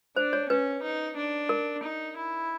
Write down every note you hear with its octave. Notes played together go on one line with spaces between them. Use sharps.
D4 C5
C#5
C#4 B4
D#4
D4
A#4
D#4
E4